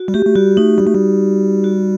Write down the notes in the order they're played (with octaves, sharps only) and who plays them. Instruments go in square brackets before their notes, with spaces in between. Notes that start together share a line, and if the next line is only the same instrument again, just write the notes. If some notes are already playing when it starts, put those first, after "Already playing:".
Already playing: [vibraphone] F#4
[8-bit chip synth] G3
[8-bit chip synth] A3 [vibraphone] G4
[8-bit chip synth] A3
[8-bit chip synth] G3 [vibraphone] F#4
[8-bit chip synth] A3 [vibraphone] D#4
[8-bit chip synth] G3
A3
G3
[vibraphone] F#4